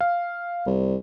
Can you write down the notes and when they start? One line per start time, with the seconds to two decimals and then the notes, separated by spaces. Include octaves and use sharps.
0.01 F5
0.66 C2